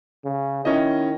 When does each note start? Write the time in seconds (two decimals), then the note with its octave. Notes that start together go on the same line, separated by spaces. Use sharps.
0.25 C#3
0.65 D#3 C#4 E4 D#5